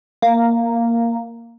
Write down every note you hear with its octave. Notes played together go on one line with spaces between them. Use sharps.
A#3